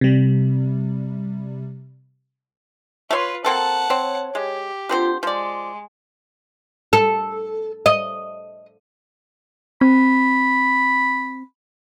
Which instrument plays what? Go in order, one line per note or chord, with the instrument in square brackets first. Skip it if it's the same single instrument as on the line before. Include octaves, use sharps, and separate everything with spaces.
[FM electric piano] C3 G3
[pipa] A3 C#5 C6 [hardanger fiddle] F4 B4
[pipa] A#3 C4 A4 [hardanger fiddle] F#5 A5
[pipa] C4 [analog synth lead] C#5
[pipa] G#3 [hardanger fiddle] G4
[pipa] D3 C4 C5 [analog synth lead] F4
[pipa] F3 D5 [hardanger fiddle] G#3 [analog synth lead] C6
[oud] A4
D#5
[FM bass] C4 [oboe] B5